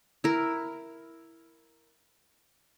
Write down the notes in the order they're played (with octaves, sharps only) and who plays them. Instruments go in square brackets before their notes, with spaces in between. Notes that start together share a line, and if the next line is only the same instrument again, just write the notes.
[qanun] E4 A#4